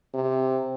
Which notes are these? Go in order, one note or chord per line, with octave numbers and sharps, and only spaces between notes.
C3